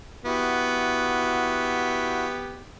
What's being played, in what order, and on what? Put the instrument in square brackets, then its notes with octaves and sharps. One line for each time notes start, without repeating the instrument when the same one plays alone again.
[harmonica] B3 G4 [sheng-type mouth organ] E4 F#4